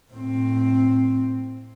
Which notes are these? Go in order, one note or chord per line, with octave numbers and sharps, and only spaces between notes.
A2 C4